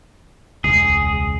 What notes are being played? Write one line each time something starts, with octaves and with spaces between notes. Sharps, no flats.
E1 C#2 G#4